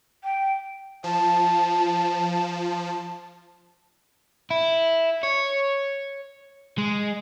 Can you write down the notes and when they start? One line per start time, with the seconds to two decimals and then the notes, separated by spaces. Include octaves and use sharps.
0.24 G5
1.04 F3 A5
4.50 E4
5.23 C#5
6.78 G#3